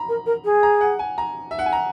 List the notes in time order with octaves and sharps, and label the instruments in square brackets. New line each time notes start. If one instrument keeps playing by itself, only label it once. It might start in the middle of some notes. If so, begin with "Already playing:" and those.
Already playing: [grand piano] A#5 B5
[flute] A#4
A#4
G#4
[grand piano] A#5
F#5
G#5
A#5
E5
F#5
G#5
A#5